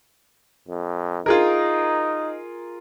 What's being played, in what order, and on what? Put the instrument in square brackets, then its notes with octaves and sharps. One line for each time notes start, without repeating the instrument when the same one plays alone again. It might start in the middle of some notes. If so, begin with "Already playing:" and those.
[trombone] F2
[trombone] D#4 [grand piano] F4 G#4 A#4